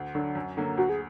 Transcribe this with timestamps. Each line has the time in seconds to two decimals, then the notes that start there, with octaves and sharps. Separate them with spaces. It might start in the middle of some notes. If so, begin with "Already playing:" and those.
Already playing: D2
0.15 D3 F#3 D4
0.35 F#2
0.57 D3 F#3 A#3
0.77 D2 F#4
0.89 G#4